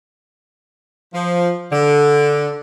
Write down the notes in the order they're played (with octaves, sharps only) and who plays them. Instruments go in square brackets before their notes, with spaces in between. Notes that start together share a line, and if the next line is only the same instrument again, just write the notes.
[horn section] F3
D3